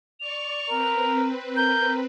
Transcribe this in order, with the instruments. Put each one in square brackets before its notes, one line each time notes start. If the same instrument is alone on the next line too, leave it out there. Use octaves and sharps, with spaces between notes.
[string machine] D5 C#6 [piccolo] F7
[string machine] C4 B4 [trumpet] A#4
[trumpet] A#4 [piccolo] G6